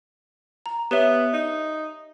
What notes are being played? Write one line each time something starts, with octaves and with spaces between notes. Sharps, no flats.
A#5
B3 G4 C#5 E5
D#4